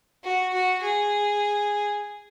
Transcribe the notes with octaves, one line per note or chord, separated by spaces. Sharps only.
F#4
F#4
G#4